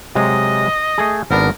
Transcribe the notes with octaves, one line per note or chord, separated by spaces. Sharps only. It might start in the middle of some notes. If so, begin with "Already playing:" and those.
C3 F#3 G#3 D#5
A3 G#4
G#1 B3 D4 A#4